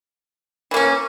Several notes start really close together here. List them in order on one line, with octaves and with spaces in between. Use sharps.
E3 A#3 C#4